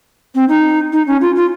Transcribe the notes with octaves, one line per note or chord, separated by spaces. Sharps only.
C4
D#4
D#4
C#4
F4
F4